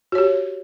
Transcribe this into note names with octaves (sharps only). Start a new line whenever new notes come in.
F#4 G4 C#5